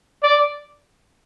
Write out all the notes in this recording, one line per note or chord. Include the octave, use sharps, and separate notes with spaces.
D5